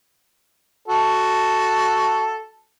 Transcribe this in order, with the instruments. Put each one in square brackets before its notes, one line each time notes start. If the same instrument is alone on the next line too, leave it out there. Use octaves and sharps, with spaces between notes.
[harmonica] F#4 A4